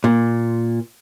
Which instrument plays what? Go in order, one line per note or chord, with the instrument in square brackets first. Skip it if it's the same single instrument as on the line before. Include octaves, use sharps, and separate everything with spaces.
[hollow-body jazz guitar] A#2